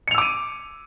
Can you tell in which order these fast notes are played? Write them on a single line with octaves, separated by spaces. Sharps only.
C#7 F7 E6 D6 D#7